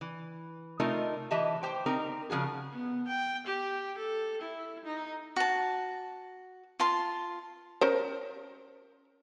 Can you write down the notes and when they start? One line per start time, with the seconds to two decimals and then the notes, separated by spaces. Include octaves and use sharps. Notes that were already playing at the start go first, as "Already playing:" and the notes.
0.01 E3
0.80 C3 A3 D#4 F4 A#4 D#5
1.31 E3 G4 D#5 E5 A5
1.63 G4 C5 G5
1.86 C4 D#4 A#4 A#5
2.30 C#3 F3 F#4 G#4
2.73 B3
3.08 G5
3.46 G4
3.97 A4
4.41 E4
4.85 D#4
5.36 F#4 A5
6.80 F4 A5 C6
7.81 C#4 A#4 C5